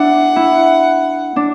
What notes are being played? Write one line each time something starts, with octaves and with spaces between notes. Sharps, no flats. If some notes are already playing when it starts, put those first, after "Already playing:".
Already playing: D4 E4 F#5
E4
D4